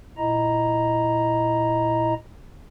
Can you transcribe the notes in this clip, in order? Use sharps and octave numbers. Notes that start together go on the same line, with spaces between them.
A#2 E4 D#5 A#5